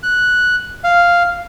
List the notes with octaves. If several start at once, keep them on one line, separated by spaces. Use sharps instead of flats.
F#6
F5